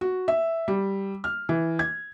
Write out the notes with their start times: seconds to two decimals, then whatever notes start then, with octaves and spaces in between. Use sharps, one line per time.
0.01 F#4
0.28 E5
0.68 G3
1.24 F6
1.49 E3
1.79 G#6